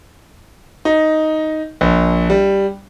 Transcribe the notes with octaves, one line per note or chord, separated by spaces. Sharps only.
D#4
A#1
G3